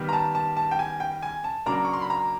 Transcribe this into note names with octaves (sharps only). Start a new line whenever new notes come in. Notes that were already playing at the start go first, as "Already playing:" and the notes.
Already playing: D#3 G3 B3
A#5
A5
A5
A5
G5
G#5
G5
G#5
A5
C#3 F#3 A#3 D4 A#5
C#6
C6
B5
A#5